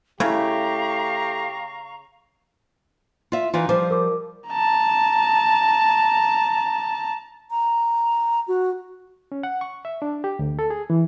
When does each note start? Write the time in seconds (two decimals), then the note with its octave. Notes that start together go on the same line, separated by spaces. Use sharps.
0.20 C#3 A3 E4 G4 F5 A#5 C#6
3.32 F4 E5
3.54 E3 D#4 F4
3.69 F3 G3 C5 D6
3.90 A#4 D6
4.48 A5 A#5
7.51 A#5
8.48 F#4
9.32 C#4
9.43 F#5
9.61 C#6
9.85 E5
10.02 D4
10.24 G4
10.39 D2
10.59 A4
10.70 G#4
10.90 E3